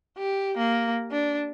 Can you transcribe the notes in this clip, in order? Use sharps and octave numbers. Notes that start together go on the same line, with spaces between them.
G4
A#3
D4